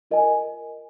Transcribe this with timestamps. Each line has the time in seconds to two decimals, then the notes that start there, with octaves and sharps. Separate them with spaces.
0.11 F4 A#4 D#5 G#5